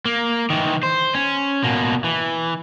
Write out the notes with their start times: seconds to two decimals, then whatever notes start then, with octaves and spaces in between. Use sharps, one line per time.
0.05 A#3
0.50 D#3 E3
0.83 C5
1.15 C#4
1.64 B2 A#3
2.04 E3